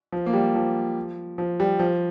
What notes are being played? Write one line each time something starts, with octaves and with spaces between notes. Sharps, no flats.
F3
A#3
G3
F3
F3
G3
F3